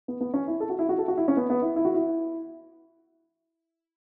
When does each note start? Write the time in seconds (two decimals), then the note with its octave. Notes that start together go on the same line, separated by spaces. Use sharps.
0.08 B3
0.21 B3
0.34 C#4
0.47 E4
0.60 A4
0.70 F#4
0.79 E4
0.89 F#4
0.98 A4
1.08 F#4
1.17 E4
1.28 C#4
1.37 B3
1.50 B3
1.62 E4
1.76 E4
1.85 F#4
1.94 E4